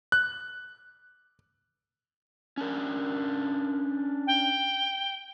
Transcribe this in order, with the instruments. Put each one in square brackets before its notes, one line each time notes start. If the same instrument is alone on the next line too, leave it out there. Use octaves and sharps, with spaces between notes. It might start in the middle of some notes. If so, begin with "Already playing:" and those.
[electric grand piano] F#6
[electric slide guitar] C#4 D4 A#4
[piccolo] G5